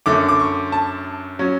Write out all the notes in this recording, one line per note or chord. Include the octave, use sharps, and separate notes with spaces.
F#2 D3 A3 D6
D6
C#6
A5
F#3 C#4